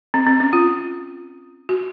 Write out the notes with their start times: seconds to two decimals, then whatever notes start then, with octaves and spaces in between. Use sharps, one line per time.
0.14 C4
0.27 C4
0.40 C#4
0.53 F4
1.69 F#4